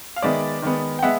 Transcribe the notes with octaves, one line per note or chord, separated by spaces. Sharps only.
F5
D#3 G#3 B3 D5 E5
D#3 G#3 B3
G5
G#3 B3 E5 F#5